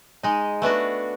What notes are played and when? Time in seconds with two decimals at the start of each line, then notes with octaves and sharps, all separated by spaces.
0.23 G#3 D#4
0.62 A3 B3 D4 F#4